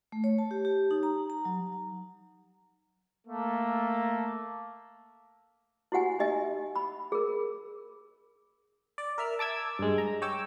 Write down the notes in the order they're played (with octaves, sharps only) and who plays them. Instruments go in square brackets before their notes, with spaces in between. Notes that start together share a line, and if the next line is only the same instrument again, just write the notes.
[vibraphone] A3
C#5
A5
G4
G4
D#4
A#5
A#5
F#3
[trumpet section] A3 A#3
[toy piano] E4 F#4 G4 F#5 G#5
D#4 G4 D#5 E5 G#5
B5
G#4 A#4
[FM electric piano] D5
A#4 E5 F6
A5 D6 E6 G#6
G2 G#3
A#5
C#5 G5 D6 E6